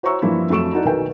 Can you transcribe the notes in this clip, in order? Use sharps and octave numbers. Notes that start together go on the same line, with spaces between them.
F#4 C5 C#5 A#5 C#6 E6
G2 E3 F3 A#3 E4
F2 F#3 A3 C#6 D7 E7
D#4 E4 F#4 A4 D5
B1 D#3 A#4 B4 G5